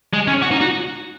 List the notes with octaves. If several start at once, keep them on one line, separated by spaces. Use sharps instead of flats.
G#3
C#4
F#4
D#4
F#4